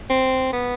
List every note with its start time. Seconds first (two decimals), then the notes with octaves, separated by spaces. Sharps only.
0.10 C4
0.53 B3